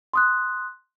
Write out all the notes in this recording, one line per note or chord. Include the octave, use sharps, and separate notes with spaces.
C6 D#6 F#6